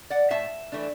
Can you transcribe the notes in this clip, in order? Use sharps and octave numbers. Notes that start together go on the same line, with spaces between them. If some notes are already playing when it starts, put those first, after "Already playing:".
D5 F#5
A2 E5 A5
E3 A3 D4